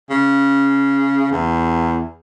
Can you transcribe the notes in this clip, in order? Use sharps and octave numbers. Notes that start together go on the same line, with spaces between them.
C#3
E2